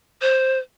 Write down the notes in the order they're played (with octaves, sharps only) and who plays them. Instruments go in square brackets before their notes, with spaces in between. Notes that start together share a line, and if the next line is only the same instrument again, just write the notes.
[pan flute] C5